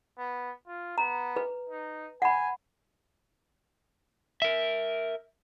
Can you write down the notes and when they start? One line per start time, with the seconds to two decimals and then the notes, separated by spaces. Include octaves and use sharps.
0.18 B3
0.67 F4
0.98 B3 A#5
1.36 B4
1.69 D#4
2.22 F#5 G#5 B5
4.42 A#4 E5